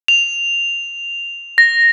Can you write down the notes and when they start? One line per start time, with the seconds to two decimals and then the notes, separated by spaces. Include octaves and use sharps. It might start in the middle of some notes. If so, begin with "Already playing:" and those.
0.08 F7
1.58 A#6